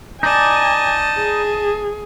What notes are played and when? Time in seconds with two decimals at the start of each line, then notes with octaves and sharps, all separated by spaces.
0.23 D#4 D5 D#5 G#5 A5
1.18 G#4